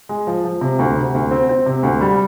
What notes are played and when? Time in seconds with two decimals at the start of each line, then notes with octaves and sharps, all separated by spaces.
0.09 G#3
0.27 F3
0.45 F3
0.61 C3
0.79 D2
0.96 C3
1.14 D2
1.31 C4
1.49 C4
1.66 C3
1.83 D2
2.01 G3